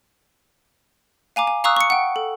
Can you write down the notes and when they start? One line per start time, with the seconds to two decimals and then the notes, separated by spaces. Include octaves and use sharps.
1.36 F5 G#5 A#5 D6
1.47 G#5
1.64 F5 A#5 C#6 D#6 E6 F#6
1.76 C#6 C#7
1.90 F#5 G5
2.16 A4